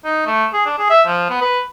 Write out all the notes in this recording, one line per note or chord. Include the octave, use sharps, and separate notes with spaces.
D#4
A3
G#4
D4
G#4
E5
F3
B3
B4